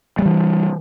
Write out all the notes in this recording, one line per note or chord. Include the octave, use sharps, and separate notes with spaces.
E3 G3 G#3